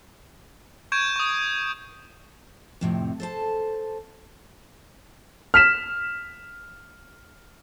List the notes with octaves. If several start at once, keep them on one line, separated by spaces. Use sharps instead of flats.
C#6 G6 G#6 D7 E7
C#6 D#6
F2 A2 C3
A4 C5 A5
F6 B6 E7